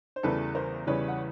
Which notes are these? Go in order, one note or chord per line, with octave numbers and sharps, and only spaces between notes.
C5
E2 C#3 E3 G3 A4 B4
A#4 C5
E2 C#3 E3 G3 B4 C#5
F#5